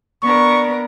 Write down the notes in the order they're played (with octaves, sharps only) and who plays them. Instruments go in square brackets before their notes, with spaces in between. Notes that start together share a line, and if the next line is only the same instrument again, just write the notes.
[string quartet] B3 D4 A#4 [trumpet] C#6